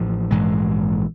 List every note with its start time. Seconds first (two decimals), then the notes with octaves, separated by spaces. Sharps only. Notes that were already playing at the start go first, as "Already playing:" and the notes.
Already playing: A1 A2 F3
0.31 A#1 G#2 E3 G#3